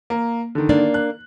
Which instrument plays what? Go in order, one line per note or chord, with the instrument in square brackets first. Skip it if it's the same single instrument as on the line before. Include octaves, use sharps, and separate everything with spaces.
[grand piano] A#3
D3 D#3
[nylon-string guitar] A#3 D4 D5
[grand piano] F#6